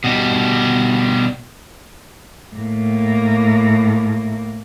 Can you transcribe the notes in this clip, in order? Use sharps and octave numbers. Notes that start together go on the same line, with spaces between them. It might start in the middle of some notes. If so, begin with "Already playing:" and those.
B2 G3
A2 A#3